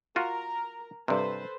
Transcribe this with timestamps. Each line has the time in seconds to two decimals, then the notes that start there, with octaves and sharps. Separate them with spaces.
0.16 F4 F#4 A#4 A#5
1.08 G2 C3 A4 B4 C5